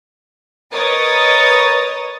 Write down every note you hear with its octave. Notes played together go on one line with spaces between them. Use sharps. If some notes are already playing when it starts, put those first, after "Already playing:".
A#4 B4 C#5 D#5 D#6 A6